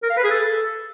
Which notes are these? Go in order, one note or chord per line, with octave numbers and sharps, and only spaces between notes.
A#4
F5
B4
G#4
A4